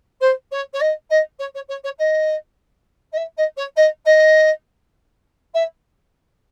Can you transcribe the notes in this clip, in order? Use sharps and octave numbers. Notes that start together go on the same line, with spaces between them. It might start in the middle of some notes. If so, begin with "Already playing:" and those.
C5
C#5
C#5
D#5
D#5
C#5
C#5
C#5
C#5
D#5
D#5
E5
D#5
C#5
D#5
D#5
E5